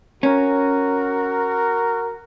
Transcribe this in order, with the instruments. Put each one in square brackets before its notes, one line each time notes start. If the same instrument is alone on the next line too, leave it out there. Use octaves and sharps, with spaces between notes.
[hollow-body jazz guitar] C#4 [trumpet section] F#4 A#4